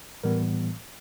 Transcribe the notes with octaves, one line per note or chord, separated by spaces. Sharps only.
A2 E3 G3 B3 A#4